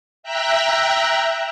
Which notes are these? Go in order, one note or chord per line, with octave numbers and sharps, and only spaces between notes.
E5 G5 A#5 E6 F#6